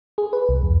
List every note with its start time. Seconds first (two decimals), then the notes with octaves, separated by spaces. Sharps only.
0.18 G#4
0.33 B4
0.49 C2
0.63 F2